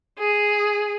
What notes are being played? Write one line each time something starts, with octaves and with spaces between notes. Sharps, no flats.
G#4